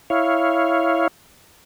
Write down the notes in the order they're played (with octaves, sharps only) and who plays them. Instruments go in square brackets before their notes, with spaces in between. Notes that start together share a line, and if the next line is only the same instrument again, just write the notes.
[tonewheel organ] E4 C#5 F5